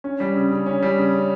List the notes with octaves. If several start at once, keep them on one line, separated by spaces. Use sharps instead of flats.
C#4
G3
C#3
C#3
C#4
G3
C#3
C#3